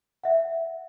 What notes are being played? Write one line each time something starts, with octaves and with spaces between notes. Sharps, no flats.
E5 F#5